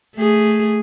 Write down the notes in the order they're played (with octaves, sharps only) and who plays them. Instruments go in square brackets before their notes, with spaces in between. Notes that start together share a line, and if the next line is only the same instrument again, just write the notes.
[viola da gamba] A3 G#4